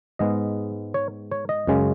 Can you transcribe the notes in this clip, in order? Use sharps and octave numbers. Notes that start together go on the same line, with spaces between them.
G#2 G#3 B3 D#5
C#5
C#5
D#5
F#2 C#3 G#3 C#4